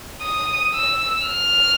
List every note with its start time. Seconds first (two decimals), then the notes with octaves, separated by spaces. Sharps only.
0.23 D#6
0.75 E6
1.27 F6